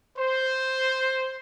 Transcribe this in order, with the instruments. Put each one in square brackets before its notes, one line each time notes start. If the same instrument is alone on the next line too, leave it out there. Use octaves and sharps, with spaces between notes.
[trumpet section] C5